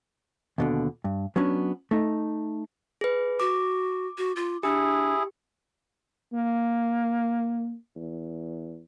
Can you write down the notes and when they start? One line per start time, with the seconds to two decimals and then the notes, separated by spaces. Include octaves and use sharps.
0.58 D#2 B2 D3
1.04 G2
1.36 F#3 B3 C#4 D4
1.91 A3 D#4
3.01 G#4 B4
3.40 F#4 D6
4.18 F#4
4.36 F4
4.63 D4 E4 G4 G#4
6.33 A#3
7.96 E2